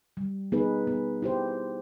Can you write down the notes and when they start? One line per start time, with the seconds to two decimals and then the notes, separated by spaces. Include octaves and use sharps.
0.17 G3
0.52 B3 D#4 G#4 B4
0.87 B3
1.22 E4 G4 C5